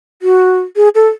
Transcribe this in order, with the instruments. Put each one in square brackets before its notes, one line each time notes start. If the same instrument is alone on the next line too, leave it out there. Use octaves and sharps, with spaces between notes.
[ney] F#4
G#4
A4